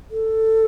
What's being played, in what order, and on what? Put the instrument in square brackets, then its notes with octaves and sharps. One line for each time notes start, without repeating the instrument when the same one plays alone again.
[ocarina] A4